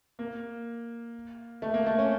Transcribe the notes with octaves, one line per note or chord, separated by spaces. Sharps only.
A#3
A3
A#3
A3
C#4